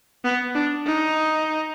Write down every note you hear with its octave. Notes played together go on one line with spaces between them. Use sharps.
B3
D4
D#4